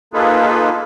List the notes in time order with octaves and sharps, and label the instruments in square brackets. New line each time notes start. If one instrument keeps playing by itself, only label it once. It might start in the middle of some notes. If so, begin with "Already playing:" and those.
[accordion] A#3 D#4 F4 G#4 A4 B4